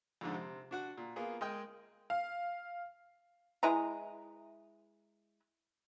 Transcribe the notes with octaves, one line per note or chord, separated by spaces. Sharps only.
F2 G#2 D3
C3
D4 F#4 F#5
A#2
A#3 B3 F4 G#4
G#3 A#4 D#5 G5
F5
G#3 E4 B4 A#5